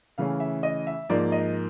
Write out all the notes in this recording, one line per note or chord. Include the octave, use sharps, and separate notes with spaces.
C#3 E3 A3 C#4 F5
E5
D#5
E5
G#2 F3 A#3 D5
D#5